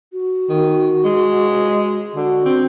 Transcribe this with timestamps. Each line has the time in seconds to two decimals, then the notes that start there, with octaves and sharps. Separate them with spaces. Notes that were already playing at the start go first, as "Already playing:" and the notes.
0.13 F#4
0.49 D#3
1.04 G#3
2.15 D3 F#4
2.45 C4